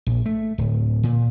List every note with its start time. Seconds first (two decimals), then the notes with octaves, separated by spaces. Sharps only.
0.06 A#1
0.26 A3
0.58 D1
1.03 A#2